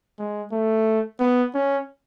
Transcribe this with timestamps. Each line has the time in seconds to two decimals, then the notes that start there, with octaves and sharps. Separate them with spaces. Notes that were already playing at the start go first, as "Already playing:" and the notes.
0.18 G#3
0.51 A3
1.20 B3
1.55 C#4